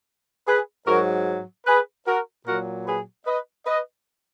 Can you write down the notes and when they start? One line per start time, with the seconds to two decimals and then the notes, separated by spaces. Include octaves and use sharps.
0.47 G#4 B4
0.87 G#2 F#3 F#4 A#4
1.67 G#4 B4
2.07 F#4 A#4
2.47 A#2 F#3 F#4 A#4
2.87 G#4 B4
3.26 B4 D#5
3.67 B4 D#5